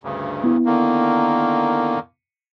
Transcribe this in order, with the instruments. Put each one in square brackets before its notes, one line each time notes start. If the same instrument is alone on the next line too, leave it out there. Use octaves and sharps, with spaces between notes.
[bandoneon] D2 G2 C#3
[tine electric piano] B3 E4
[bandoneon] D3 D#3 A#3